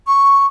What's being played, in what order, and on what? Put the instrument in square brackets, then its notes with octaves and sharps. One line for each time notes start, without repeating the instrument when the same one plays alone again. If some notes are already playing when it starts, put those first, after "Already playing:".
[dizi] C#6